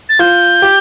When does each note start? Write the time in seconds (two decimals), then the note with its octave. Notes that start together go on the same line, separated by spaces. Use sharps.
0.09 A6
0.19 F4 G6
0.62 G4